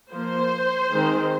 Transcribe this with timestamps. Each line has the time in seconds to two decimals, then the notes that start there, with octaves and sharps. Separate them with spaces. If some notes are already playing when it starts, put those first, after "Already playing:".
0.12 F3 A#3 C5
0.92 D#3 G#3 C4